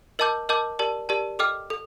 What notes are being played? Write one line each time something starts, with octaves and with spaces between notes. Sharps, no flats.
A#4 D#5 A5 D6 G6
A#4 D#5 A5 D6 G6
G4 A#4 D5 A5
G4 A#4 D5 A5
A4 D#5 G5 D6 F6
A4